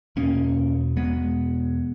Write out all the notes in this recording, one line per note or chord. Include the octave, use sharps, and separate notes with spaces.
E2 B2 A#3 C#4
E2 B2 G#3 B3